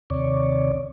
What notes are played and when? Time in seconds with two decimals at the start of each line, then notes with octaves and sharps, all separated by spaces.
0.10 D#2 C3 C#5 D5